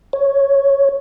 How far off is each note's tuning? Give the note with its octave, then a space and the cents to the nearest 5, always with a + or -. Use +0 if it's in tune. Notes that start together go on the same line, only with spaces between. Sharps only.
C#5 +0